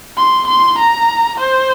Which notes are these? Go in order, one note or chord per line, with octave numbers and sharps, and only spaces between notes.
C6
C6
A#5
C5